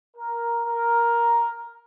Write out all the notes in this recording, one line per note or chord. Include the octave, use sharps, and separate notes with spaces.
A#4
A#4